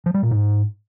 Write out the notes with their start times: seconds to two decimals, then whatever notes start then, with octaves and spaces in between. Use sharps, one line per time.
0.06 F3
0.14 G3
0.23 A#2
0.31 G#2